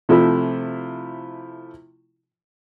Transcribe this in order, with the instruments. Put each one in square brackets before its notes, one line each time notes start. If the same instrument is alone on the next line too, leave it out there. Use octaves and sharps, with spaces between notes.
[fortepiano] C3 F3 A3 E4